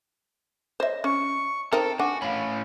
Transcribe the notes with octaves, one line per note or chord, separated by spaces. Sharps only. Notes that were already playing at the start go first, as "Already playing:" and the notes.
C5 C#5 D#5 E5
C#4 C#6
C4 D#4 A4 A#4 G5 F6
D4 F#4 F#5 G#5 C#6
A2 C#4 F5 B5